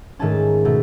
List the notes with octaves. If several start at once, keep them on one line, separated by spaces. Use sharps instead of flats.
G#2 D#3 A3 C#4 A5
B2 A3